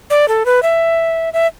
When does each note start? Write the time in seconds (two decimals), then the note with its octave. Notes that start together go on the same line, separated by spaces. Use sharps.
0.10 D5
0.28 A4
0.46 B4
0.63 E5
1.33 E5